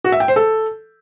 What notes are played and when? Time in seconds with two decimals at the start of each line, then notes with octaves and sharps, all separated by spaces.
0.04 F#4
0.12 E5
0.20 G5
0.28 C5
0.36 A4